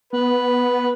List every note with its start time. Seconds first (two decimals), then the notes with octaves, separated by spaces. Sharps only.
0.13 B3 B4